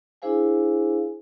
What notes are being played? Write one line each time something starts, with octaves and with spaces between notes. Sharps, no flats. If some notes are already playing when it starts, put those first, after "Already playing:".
D4 E4 G#4 C5 F5 G#5